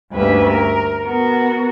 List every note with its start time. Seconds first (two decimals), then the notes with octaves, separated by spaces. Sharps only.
0.13 D2 G2 A#3 C#4 B4 E5
0.51 A#4
1.05 B3 F#4 A#4